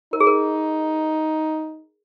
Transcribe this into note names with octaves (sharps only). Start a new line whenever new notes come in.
D#4 A#4
G#4
A#4